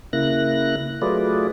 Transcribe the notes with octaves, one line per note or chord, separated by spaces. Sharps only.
C#3 A#3 E4 F#6 A#6
F#3 A3 F4 G#4 B4 D5